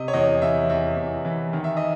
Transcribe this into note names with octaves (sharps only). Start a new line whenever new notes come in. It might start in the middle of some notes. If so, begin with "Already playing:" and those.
Already playing: C3 D#5
C#5
E2 D#5
E3 E5
E2 E5
E2
E3
D#3
E5
D#5